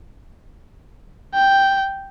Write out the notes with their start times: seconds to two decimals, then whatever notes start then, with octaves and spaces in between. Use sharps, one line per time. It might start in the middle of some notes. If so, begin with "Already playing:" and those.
1.35 G5